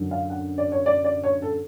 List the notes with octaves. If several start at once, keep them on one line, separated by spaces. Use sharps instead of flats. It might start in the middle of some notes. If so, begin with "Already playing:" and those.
Already playing: F#2 D3
F5
F#5
D5
C#5
D5
D5
C#5
A4